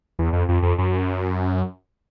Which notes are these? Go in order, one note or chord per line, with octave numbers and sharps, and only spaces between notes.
E2
F2
F2
F2
F#2